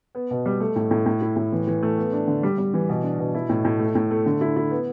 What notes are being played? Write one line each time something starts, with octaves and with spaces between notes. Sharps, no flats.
B3
B2
G3
A3
A2
A2
A2
E4
A2
E3
E3
A3
B3
D4
D3
G3
G3
E3
B2
D4
B2
E4
A2
A2
A3
A2
A3
D3
E4
E4
B3